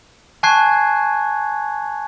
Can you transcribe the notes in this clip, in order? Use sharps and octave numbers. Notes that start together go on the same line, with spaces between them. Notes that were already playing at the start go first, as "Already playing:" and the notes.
G#5 A5 C#6 F#6 G#6 C7